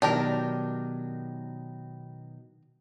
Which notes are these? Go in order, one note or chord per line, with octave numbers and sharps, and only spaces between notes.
B2 D#3 F#3 D4 G4 A#4